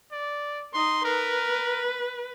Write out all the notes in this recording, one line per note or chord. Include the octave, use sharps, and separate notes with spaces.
D5
D#4 D#5 C6
A#4 B4